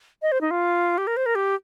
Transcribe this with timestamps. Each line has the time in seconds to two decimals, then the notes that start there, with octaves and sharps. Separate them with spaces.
0.22 D#5
0.32 C5
0.41 D#4
0.51 F4
0.98 G4
1.07 A#4
1.17 C5
1.26 A#4
1.35 G4